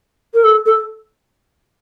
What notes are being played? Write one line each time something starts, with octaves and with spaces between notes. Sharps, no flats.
A#4
A4
A4